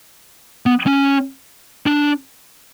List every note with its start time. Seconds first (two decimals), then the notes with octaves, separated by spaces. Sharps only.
0.66 B3
0.86 C#4
1.86 D4